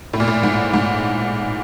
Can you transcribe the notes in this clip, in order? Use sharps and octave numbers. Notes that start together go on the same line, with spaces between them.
A2
A#2
A2
G#2
G#2